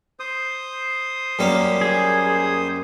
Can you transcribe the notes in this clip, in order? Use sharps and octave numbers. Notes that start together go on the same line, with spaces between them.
C5 D#6
F#2 G3 A#3
G#4